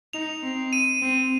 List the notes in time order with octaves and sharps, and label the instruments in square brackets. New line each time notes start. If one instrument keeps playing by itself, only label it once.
[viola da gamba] D#4 [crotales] F7
[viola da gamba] C4
[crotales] D#7
[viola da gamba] C4